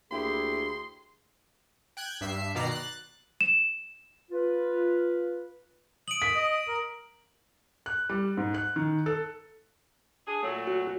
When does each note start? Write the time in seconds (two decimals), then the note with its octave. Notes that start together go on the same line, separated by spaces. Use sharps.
0.11 D2 A#3 E4 G4 G#4 C6
1.97 G5 F#6 G#6
2.21 G2 E5 C7
2.55 B2 D#3 D5 A#5 C7
2.71 F#6 A6
3.41 E7
4.31 F4 B4
6.08 D#6 D7 F#7
6.22 B6
6.35 D#5
6.68 A#4
7.86 F#6
8.10 G3
8.37 G#2
8.54 F#6
8.76 D#3
9.06 A4
10.27 D4 G#4
10.43 A#2 F#3 A3
10.67 F#4